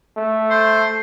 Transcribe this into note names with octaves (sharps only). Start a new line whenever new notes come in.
A3
C5